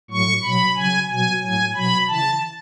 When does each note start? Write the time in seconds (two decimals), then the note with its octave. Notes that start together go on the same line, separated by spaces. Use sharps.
0.10 A2 F#3 C#6
0.43 B2 F#3 B5
0.76 C#3 F#3 G#5
1.09 B2 F#3 G#5
1.42 A2 F#3 G#5
1.75 B2 F#3 B5
2.08 C#3 E3 A5